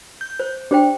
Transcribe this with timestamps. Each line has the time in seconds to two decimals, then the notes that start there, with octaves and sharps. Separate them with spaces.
0.21 G6
0.39 C5
0.71 D4 G4 C5 G5